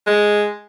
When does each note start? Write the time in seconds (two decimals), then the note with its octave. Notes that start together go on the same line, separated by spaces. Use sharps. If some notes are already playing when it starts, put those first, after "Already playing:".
0.07 G#3